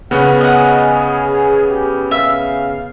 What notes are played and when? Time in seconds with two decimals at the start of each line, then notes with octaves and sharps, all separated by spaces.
0.11 C#3 B3 C#4 F#5
0.41 G#4 D#5 F#5
1.70 G4
2.11 E5 F5